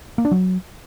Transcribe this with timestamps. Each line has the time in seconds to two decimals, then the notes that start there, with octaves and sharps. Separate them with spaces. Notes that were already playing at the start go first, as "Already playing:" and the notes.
0.18 A#3
0.25 D4
0.31 F#3